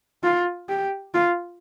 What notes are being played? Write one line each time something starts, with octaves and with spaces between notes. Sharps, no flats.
F4
G4
F4